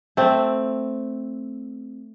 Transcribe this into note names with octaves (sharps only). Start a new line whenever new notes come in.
A3 C4